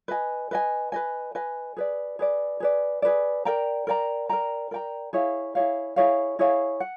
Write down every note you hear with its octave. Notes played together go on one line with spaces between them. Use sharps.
B4 D#5 G#5
B4 D#5 G#5
B4 D#5 G#5
B4 D#5 G#5
G#4 B4 D5
G#4 B4 D5
G#4 B4 D5
G#4 B4 D5
A#4 D5 G5 A#5
A#4 D5 G5 A#5
A#4 D5 G5 A#5
A#4 D5 G5 A#5
E4 G#4 C#5 F5
E4 G#4 C#5 F5
E4 G#4 C#5 F5
E4 G#4 C#5 F5
F#5